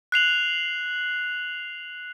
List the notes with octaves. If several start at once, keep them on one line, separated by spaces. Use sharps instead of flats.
F#6 C7 F7 F#7